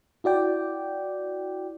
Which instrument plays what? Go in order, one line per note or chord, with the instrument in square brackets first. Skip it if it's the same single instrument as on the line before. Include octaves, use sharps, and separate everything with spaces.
[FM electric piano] E4 F#4 D5 G5